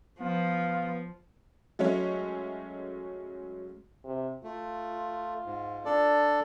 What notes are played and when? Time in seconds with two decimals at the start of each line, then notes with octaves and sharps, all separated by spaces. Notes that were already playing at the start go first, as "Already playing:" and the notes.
0.20 F3 B3 F4
1.79 F#3 G#3 A3 C#4 C#5
4.05 C3
4.44 A3 F4
5.45 G#2
5.85 D4 A4 D5